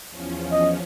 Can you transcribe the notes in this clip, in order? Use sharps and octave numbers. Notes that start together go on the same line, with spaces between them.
E2 F3 C#4
D#5